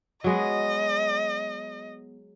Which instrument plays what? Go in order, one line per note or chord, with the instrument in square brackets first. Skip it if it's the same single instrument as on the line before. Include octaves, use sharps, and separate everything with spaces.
[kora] F#3 G#3 B3 [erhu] D#5